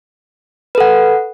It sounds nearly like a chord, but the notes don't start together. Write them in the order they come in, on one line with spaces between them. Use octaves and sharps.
B4 A4 F#5